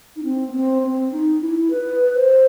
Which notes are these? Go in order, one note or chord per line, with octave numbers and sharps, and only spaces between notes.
D#4
C4
B3
C4
C4
D#4
E4
B4
C5